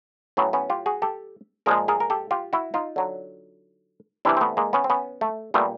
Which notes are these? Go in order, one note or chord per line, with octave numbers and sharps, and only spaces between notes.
A2 F#3 B3 C#4
B3 C#4
F4 G4
F#4 G#4
G4 A4
A#2 F3 G#3 G#4 A#4
G#4 A#4
A#4
G4 A4
F4 G4
E4 F#4
D#4 F4
D3 F#3
C3 E3 G3 D4 E4
C4
A3 B3
G#3 A#3
B3 C#4
C4
B3 C#4
A3
A#2 G3 A3 B3